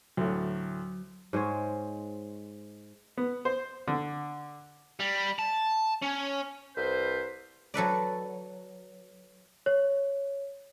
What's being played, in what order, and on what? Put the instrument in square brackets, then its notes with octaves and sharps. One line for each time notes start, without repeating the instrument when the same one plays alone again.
[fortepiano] D2 A2 [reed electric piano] F#3
[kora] G#2 G#3 C5 C#5
[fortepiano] B3
C5
D3
[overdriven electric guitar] G3
A5
C#4
[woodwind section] C2 B4 C5
[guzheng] F#3 A4 B4 D5
[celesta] C#5